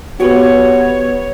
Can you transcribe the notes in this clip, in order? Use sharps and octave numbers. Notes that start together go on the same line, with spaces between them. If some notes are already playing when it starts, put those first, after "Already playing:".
B3 F#4 G4 B4 C#5